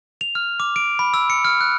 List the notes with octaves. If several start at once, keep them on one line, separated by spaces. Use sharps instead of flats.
F7
F6
D6
D7
B5
E6
C#7
F6
F#6